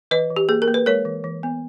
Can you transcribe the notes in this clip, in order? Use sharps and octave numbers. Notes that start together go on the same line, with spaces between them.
E3 B4 D#5
E3
G4
A#3 G#4
A#4
A#3
B4
G#3 A#4 C#5
E3
E3
B3